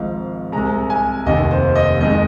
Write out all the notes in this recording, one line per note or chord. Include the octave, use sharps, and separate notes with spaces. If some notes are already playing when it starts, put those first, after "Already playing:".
Already playing: G#1 G#2 F3 F5
C2 C3 G#3 A#5
G#5
F1 D#2 D#3 D#5
C5
D#5
F2 D#3 G#3 D#5